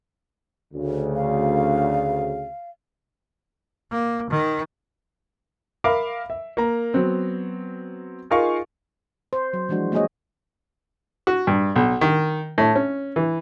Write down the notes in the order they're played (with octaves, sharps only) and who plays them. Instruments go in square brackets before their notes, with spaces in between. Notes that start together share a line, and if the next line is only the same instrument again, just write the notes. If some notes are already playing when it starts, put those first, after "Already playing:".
[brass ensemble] D2 C#3
[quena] F5
[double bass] A#3
D#3
[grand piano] A#4 E5 F5 B5 D6
E5
A#3 A#5
F#3 B3 C4
D#4 F4 G#4 A#4 F5 C#6
[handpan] C5
F#3
E3 F3 G#3 D4 F#4
G#3 A#3 F#4 G#4 C#5 D#5
[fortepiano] F#4
G2
B1
D#3
A2
C#4
E3